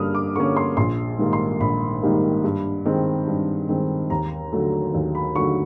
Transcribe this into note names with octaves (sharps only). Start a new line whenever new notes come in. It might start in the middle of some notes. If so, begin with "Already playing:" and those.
Already playing: G2 D3 G3 A#3 C#4 D#6 F6
D6
D3 G3 A#3 C#4 C#6
C6
A#1 C6
G#2 D#3 G3 A#3
C6
A#1 B5
G#2 D#3 G3 A#3
G2
D#3 G#3 C4
G2
D#3 G#3 C4
D#2 A#5
D3 F#3 A3
D#2
B5
D3 F#3 A3 C#6